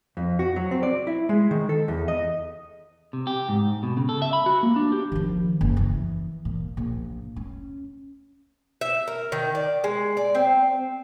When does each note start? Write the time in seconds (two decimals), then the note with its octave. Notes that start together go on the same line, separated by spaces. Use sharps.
0.17 F2
0.39 F#4
0.56 F#3
0.71 C4
0.83 D5
1.07 E4
1.29 G#3
1.51 D#3
1.69 A4
1.88 E2
2.08 D#5
3.13 C3
3.27 G4
3.49 G#2
3.83 B2
3.97 C#3
4.09 A4
4.22 E5
4.33 B5
4.46 F#4
4.63 A#3
4.76 D4
4.92 G4
5.12 D#3 F3
5.61 F#1
5.77 E3
6.45 A#2
6.77 A#1 A#2
7.36 C#4
8.81 E5
9.08 A#4
9.32 D#3
9.55 D5
9.84 G#3
10.17 D5
10.35 C4